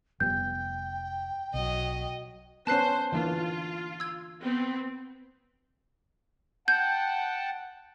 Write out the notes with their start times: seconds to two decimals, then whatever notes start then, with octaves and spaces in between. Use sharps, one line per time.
0.20 F1 G3 B3 G5 G6
1.54 B1 F#3 D#5
2.67 B3 C#4 C5 A5 F#6 C7
3.12 D3 E3 A#3 F4
4.00 E6 G#6
4.41 B3 C4
6.68 F#5 G5 A5 G6